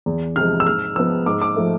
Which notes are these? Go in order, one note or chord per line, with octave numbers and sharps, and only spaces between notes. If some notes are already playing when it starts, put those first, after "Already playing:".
E2
C3 F3 G#3 F6
E6
G#2 F6
F3 G#3 B3 E6
G#2 D6
D6
F3 A3